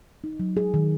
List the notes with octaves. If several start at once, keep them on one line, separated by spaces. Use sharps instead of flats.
D#4
F#3
G#4
D#3